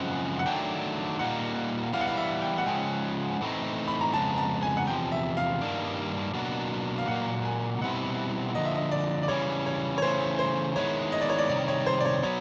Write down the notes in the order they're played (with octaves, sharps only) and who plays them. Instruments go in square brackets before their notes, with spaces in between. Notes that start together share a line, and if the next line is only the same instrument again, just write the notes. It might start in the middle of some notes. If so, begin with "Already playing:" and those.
Already playing: [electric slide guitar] F#2 C#3 F3 G#3 C4 [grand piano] F#5
[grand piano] F#5
[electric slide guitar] D#3 F#3 A3 D4 [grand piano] G5
[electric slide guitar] A#2 G3 A#3 D#4 [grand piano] F#5
[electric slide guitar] E3 G3 B3 E4 [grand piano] F5
[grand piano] F#5
F5
E5
G5
F#5
[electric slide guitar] C#3 F3 G#3 C#4 [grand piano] G5
[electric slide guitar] A2 E3 A3 C4 D#4
[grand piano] B5
A#5
[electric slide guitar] F2 C#3 G#3 B3 [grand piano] A5
[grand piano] A5
G#5
F#5
[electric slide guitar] E2 C3 F3 [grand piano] G5
[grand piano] E5
F5
[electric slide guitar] G2 D#3 G3 A#3 D4
B2 F#3 A#3 D4 F#4
[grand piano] F5
[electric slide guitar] A#2 F#3 A#3 [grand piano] F#5
[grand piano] G#5
[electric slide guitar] B2 G3 C4 E4 [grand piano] F#5
[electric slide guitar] D3 F3 A#3 [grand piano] D#5
[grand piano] E5
D#5
D5
D5
[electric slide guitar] C#3 E3 G3 [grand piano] C#5
[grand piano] C#5
C#5
[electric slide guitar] C#3 E3 A3 [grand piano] C5
[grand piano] C5
[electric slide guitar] D#3 G#3 B3 E4 [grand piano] C#5
[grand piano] D#5
D5
C#5
D5
[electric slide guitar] C3 D#3 G3 [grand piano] D5
[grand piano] C#5
C5
D5
C#5
[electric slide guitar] F#3 B3 [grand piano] C#5